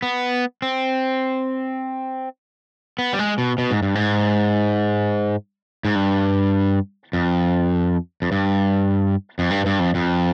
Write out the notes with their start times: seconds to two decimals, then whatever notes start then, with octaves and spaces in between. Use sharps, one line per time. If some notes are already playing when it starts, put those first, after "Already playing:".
0.02 B3
0.62 C4
2.98 B3
3.13 G3
3.19 G#3
3.38 B2
3.58 B2
3.71 G#2
3.83 G2
3.95 G#2
5.85 G#2
5.95 G2
7.13 F2
8.22 F2
8.32 G2
9.39 F2
9.51 G2
9.66 G2
9.80 F2
9.95 F2